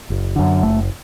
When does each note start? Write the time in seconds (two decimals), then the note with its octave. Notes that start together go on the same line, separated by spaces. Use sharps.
0.10 F#1
0.36 F#2 D3
0.62 F#1 A3